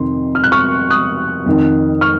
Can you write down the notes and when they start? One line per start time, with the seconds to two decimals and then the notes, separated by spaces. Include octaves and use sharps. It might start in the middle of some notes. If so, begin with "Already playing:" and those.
Already playing: F2 C3 D#3 C6
0.35 F6
0.44 F#6
0.52 C#6 F6
0.90 D#6 F#6
1.46 F2 D#3
2.01 C#6 F6